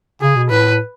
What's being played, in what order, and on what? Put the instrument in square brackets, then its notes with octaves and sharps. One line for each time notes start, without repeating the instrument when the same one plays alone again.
[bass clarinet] C#3 [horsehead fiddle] G#4
[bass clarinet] B2
[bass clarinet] A2 [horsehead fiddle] B4